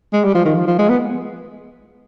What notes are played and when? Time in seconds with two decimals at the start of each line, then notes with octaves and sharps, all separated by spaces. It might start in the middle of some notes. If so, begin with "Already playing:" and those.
0.13 G#3
0.24 G3
0.35 F3
0.45 D#3
0.56 F3
0.67 F3
0.79 G#3
0.89 B3